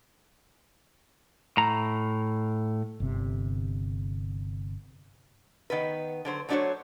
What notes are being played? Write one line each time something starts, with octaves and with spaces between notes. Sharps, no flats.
A2 A#5
G1 C3
D#3 B3 B4
D3 F#3 C5
F#3 A3 D4 F#4 C5 C#5